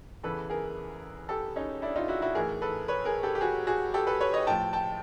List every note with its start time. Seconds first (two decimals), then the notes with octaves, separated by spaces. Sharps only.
0.23 E2 C#3 E3 A4 B4
0.50 G#4 A#4
1.29 G4 A4
1.56 C#4 D#4
1.82 D4 E4
1.96 D#4 F4
2.08 E4 F#4
2.22 E4 F#4
2.35 A2 E3 G#4 A#4
2.62 A4 B4
2.88 B4 C#5
3.05 G#4 A#4
3.23 G4 A4
3.35 G4
3.41 F#4 G#4
3.67 F#4 G#4
3.94 G4 A4
4.07 A4 B4
4.21 B4 C#5
4.33 C#5 D#5
4.47 A2 F3 G5 A5
4.73 G5 A5